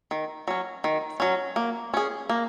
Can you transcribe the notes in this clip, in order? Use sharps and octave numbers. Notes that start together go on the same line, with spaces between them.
D#3
F#3 C#4
D#3
F#3 C#4
A#3
C#4 G#4
A#3